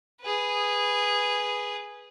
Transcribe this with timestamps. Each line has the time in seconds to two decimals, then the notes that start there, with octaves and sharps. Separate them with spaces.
0.21 G#4 B4